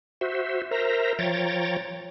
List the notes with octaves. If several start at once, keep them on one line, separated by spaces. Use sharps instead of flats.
F#4 C5 E5
A#4 C5 E5 A#5
F3 C#5 G5 A#5 A6